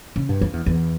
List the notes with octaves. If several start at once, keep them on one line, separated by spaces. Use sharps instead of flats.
C#3
G2
F2
E2
E2